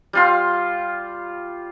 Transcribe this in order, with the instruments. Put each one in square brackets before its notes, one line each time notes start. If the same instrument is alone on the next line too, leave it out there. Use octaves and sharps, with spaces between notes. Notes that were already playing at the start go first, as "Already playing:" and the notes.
[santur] G3 F4 C6